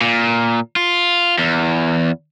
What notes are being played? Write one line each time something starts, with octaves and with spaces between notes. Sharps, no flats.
A#2
F4
E2